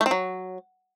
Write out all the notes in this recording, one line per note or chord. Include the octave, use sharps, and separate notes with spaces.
A3
C4
F#3